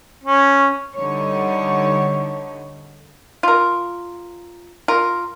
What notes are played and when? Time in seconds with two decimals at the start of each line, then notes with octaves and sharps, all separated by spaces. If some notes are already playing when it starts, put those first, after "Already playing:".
0.24 C#4
0.95 D3 G3 D#4 C#5
3.43 F4 A#4
4.88 F4 A#4